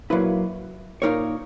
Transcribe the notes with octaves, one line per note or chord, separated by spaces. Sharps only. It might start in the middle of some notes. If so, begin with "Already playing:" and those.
A#2 F#3 A#3 E4 B4
A#2 A#3 D#4 A#4 C#5